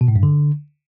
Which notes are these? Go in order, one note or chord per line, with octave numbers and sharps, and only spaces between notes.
B2
A2
G2
D3